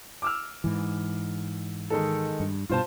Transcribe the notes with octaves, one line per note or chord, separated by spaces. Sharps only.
D6 E6 F6
G#2 E3
D#3 G#3 A4
G2
G2 B2 F4 C5 A5